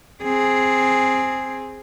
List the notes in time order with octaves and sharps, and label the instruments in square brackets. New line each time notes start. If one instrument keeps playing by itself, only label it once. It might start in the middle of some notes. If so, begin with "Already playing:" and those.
[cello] C4 G#4